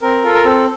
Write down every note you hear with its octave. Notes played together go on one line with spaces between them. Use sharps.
C4 A#4
F4 A4
A#4
C4 A4